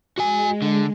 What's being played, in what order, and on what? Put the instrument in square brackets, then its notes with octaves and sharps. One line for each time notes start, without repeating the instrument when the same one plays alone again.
[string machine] G#3 [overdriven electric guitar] F#4 G#5
[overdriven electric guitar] D3